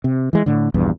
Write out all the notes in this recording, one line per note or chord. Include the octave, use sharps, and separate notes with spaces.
C3
E3 G#3
A2 D3
A#1 E2 G2